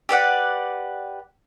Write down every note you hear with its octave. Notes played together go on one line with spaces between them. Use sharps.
G4 B4 D5 F#5